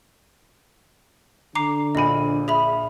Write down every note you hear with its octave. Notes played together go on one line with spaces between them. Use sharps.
D3 A#5 D6 C7
A#1 A#2 D#5 B5 D#7
G#4 E5 B5